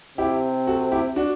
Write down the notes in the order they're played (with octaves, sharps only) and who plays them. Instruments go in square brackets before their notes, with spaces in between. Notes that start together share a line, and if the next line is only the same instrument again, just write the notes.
[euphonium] C3 [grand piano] E4 G4
[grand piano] F#4 A4
E4 G4
D4 F#4